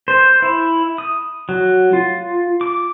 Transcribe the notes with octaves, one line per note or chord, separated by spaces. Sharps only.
C5
E4
D#6
F#3
F4
D6